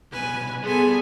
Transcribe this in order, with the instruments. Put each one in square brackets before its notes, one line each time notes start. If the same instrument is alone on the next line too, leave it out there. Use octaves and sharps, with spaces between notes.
[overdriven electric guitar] C2 B2 [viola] B4 G#5
[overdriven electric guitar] G3 C6 [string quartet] B3 [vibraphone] G#4 [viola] A4 G#5